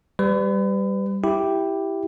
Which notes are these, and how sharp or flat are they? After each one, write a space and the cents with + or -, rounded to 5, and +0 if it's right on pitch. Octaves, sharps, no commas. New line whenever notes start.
G3 +0 B4 +35
E4 +0 G4 +0